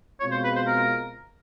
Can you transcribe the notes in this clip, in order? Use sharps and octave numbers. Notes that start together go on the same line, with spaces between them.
B2 G#3 C4 F4 C#5
C5
B4
C5
A#4